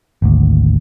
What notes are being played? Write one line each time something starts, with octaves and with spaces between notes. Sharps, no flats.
G#1 D2